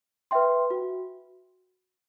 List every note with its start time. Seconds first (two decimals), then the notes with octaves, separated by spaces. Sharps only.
0.31 B4 E5 G5 C6
0.71 F#4